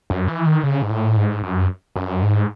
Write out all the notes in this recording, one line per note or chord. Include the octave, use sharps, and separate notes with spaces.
F#2
E3
D#3
C#3
G#2
A2
G#2
F#2
F#2
G#2